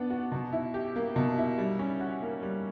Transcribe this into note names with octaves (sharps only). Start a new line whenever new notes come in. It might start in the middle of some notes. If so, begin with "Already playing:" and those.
Already playing: B3 D4
F#4
B2
E4
G4
A#3
B2
E4
G3
C#4
F#4
A#3
G3